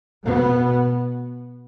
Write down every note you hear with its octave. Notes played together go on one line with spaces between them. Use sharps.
B2 B3